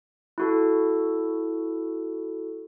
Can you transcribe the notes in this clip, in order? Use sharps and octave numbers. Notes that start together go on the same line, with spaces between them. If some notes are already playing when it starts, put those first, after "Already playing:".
E4 F#4 A4